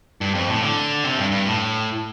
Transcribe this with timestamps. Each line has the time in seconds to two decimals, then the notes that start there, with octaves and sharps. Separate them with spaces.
0.21 G2
0.34 F2
0.49 A2
0.63 D3
1.04 C3
1.18 G2
1.31 G2
1.46 A2